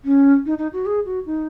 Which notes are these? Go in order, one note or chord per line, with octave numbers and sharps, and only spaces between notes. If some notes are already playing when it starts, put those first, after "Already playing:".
C#4
D#4
D#4
F#4
G#4
F#4
D#4